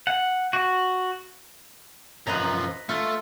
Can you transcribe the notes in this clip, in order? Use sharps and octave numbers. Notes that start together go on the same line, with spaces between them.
F#5
F#4
F#2 F3 B4 D#5 A#5
A3 F4